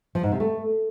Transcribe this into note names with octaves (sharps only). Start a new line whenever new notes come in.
F3
G#2
C3
A3